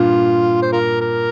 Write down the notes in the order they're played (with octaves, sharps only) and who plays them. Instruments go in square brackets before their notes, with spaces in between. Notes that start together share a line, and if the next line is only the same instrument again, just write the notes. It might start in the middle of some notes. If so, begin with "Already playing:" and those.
Already playing: [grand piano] G2 A#2 [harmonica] F4
[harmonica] C5
F4 A#4
A#4